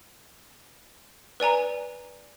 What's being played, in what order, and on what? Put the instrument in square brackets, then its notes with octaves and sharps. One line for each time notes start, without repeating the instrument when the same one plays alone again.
[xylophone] B4 D5 G#5 A#5